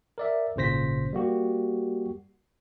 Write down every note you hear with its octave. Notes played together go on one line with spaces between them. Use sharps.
A#4 D5 E5
G#1 A#2 C#3 C5 A#6 B6
G3 A#3 F#4 G4